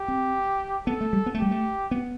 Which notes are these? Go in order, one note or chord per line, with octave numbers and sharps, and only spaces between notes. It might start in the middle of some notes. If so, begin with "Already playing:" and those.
Already playing: G4
C4
B3 A4
A3
G3
B3
A3
G3 G4
A3
B3